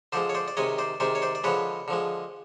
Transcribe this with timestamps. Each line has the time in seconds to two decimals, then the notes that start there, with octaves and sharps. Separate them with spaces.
0.12 D3 F3 G#3 C5 D5
0.29 C#5
0.35 C5 D5
0.48 D5
0.57 C3 D#3 G#3 C#5 D#5
0.78 C5 D5
1.00 C3 D#3 G#3 C5 D5
1.15 C#5
1.22 C5 D5
1.35 D5
1.44 D3 F3 G#3 B4 C#5
1.88 D3 F3 G#3